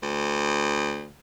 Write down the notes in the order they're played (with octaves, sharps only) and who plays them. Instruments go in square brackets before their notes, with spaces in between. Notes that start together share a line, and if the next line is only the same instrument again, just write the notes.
[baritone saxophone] D2